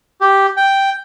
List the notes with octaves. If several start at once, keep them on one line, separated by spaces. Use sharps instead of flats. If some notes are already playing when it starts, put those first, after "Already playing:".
G4
G5